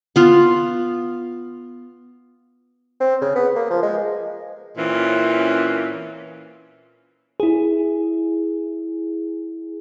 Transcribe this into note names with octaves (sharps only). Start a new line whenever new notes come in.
B3 F4
C4
C#3
B3
A#3
F3
G#3
A#2 E3 C4 C#4
E4 G#4